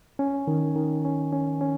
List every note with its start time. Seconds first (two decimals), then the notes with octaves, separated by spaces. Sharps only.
0.19 C#4
0.47 D#3
0.76 D#3
1.05 C#4
1.33 C#4
1.61 C#4